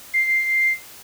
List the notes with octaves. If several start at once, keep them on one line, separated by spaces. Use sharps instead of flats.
C7